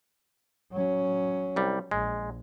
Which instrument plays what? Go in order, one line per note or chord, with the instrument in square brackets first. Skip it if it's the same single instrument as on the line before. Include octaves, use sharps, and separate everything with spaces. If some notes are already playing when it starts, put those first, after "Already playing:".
[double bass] F#3 C#4
[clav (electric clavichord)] C2 G3
[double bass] A#1 [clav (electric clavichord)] G#3